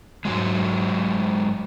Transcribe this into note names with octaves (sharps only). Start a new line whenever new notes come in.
G#2 C#3 F#3 G#3